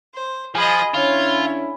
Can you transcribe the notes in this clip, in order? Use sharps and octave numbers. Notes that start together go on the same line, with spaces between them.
C5
F3 G#4 D#5 G#5 B5
D3 C#4 E4 F4 C#5